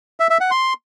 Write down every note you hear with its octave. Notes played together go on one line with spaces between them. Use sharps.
E5
E5
F#5
C6